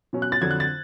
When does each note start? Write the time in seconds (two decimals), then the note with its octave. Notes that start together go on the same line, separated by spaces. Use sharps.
0.13 B2 F#3 C#4
0.22 F#6
0.32 A6
0.41 F2 D3 F#3 G#6
0.51 F#6
0.60 A6